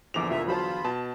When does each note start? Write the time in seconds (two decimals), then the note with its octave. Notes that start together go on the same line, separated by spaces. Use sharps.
0.14 A#1 E2 D3 F3 D6 F7
0.30 E1 F2 D#3 F4 E5
0.48 F#3 F4 C5 A5 B5
0.84 B2 A5